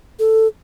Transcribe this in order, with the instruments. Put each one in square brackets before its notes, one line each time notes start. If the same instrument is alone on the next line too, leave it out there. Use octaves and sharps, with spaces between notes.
[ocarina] A4